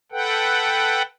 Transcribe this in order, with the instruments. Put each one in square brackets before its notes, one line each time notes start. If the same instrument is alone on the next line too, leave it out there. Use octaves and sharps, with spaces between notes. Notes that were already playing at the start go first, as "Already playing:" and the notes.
[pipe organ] A4 B4 F#5 G5